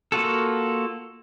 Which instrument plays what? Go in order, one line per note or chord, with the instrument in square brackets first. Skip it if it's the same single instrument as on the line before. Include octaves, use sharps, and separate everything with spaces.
[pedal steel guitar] A#3 F4 F#4 A4